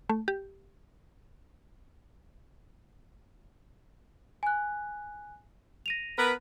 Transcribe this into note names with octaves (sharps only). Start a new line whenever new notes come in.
A3
G4
G#5 F#6
A#6 D#7 F7
B3 A#4 B4